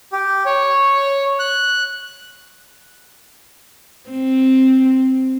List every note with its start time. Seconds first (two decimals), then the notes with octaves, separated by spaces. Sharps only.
0.13 G4
0.45 C#5
1.39 F#6
4.10 C4